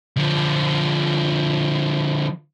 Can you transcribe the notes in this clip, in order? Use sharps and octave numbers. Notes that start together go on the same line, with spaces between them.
D3 F3